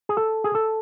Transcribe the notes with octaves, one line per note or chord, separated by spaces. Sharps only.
G#4
A4
G#4
A4